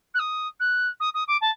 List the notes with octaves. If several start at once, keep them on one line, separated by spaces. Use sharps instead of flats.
F#6
D#6
F#6
D#6
D#6
D6
A5